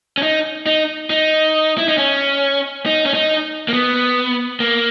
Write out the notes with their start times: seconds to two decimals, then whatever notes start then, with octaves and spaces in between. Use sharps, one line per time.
0.18 C#4
0.23 D#4
0.66 D#4
1.10 D#4
1.78 E4
1.88 D#4
1.98 C#4
2.86 D#4
3.06 C#4
3.14 D#4
3.68 A#3
3.73 B3
4.60 A#3